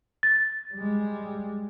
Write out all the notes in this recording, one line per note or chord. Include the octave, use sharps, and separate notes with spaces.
A6
G3 G#3